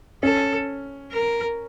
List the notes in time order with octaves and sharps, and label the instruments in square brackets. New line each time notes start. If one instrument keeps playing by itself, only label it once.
[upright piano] C#4 [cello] A4
[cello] A#4